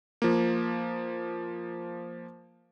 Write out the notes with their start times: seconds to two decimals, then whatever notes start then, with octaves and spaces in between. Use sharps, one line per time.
0.22 F3 A#3